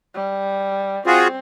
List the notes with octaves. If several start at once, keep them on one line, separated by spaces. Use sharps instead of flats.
G3
C4 F4 F#4 G#4